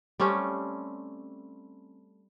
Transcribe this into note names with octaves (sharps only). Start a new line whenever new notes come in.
G3 A3 C4 C#4